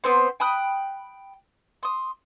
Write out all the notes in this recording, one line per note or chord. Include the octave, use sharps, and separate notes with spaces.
B3 C4 C5 C6
G5 B5 D#6 F#6
C6 D#6